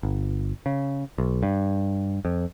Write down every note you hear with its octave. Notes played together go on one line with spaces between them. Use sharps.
G1
C#3
B1
G2
F2